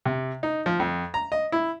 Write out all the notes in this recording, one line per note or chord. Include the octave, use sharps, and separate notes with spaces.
C3
D#4
F3
F2
A#5
D#5
E4